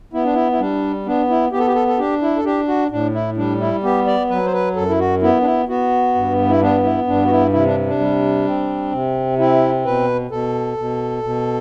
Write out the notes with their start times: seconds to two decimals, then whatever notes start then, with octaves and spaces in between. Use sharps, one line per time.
0.13 B3 E4
0.24 D4
0.34 E4
0.52 E4
0.60 G3 D4
1.06 B3 D4
1.29 E4
1.52 B3 G4
1.59 A4
1.67 G4
1.75 A4
1.88 A4
1.98 D4 G4
2.22 E4
2.37 A4
2.45 D4 G4
2.68 F#4
2.91 A2 D4
3.14 E4
3.37 G3 D4
3.60 E4
3.83 B3 G4
4.07 D5
4.30 F#3 B4
4.46 C5
4.53 B4
4.76 F#2 A4
4.89 E4
4.99 F#4
5.22 B3 E4
5.41 D4
5.46 E4
5.68 B3 F#4
6.15 G2
6.49 E4
6.61 B3 D4
6.84 E4
7.07 G2 D4
7.25 F#4
7.31 E4
7.53 C3 E4
7.65 D4
7.86 D4
7.99 G3
8.46 C4
8.92 C3
9.39 C4 E4
9.85 B2 B4
10.31 B2 A4
10.77 B2
11.23 B2